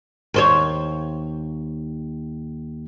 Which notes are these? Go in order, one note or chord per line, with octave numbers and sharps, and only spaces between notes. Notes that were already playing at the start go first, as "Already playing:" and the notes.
D#2 C5 C#5